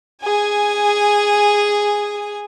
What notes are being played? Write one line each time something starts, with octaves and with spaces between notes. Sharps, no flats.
G#4 G#5